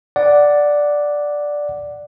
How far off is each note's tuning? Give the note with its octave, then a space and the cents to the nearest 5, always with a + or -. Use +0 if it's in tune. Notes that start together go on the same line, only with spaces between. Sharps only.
D5 +0 F#5 +0